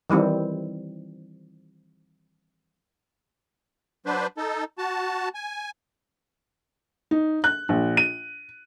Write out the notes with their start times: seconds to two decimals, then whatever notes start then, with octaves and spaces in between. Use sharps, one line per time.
0.10 D#3 E3 G3 C4
4.06 F#3 D4 B4 C5
4.37 D#4 A4
4.78 F#4 A5
5.34 G#5
7.11 D#4
7.44 F#6
7.69 A#1
7.97 D#7